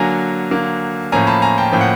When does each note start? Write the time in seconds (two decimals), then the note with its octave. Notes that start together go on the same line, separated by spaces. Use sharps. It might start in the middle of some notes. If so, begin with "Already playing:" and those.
Already playing: D3 F#3 A#3 G#5 A#5
0.51 D3 F#3 A#3
1.12 A2 F3 A#3 C#4 G#5 A#5
1.27 A5 B5
1.42 G#5 A#5
1.58 G5 A5
1.72 A2 F3 A#3 C#4 G5
1.81 F#5